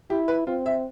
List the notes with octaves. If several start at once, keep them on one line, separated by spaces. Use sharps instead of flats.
E4 G4
B4
C4 F4
E5